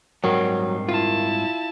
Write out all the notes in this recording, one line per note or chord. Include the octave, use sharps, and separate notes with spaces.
G#2 D#3 F#3 G3 C4
E4 F4 A5